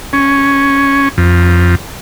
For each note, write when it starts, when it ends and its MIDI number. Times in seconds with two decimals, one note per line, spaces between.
0.13 1.09 61
1.18 1.75 41